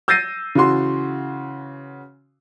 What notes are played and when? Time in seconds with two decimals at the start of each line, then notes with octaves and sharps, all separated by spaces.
0.08 E6 G6 A6 A#6 C7 D#7
0.55 C#3 E3 F#4 C6